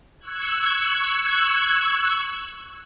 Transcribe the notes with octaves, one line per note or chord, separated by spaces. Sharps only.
C#6 E6 F#6 G#6